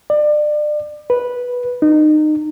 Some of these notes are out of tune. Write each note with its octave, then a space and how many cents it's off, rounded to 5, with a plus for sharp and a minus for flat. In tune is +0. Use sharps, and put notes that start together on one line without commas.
D5 +30
B4 -10
D#4 -25